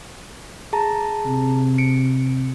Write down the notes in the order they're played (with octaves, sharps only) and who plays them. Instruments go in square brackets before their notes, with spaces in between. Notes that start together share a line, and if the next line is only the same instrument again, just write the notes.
[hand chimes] G#4 A5 A#5
[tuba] C3
[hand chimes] C#7 D7